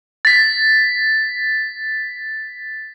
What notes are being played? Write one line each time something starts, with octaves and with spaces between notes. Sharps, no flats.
A6 B6